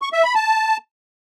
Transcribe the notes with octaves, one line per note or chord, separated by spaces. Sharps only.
C#6
E5
B5
A5